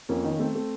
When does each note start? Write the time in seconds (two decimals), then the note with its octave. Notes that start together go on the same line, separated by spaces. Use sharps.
0.09 F2 A#3 C#4
0.24 D#3
0.32 A#3
0.39 A3 C4
0.55 A3